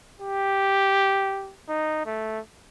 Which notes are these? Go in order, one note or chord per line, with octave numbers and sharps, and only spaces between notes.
G4
D#4
A3